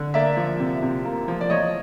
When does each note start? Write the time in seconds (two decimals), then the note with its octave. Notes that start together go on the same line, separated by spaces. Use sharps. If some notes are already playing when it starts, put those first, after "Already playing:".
Already playing: D3
0.14 A#3 D5 E5
0.37 F3
0.60 C3
0.83 C3
1.05 A#3
1.28 F3
1.41 D5
1.50 F3 C#5 D#5